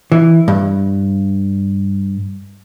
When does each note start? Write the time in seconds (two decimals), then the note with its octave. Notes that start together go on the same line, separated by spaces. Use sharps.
0.12 E3
0.48 G2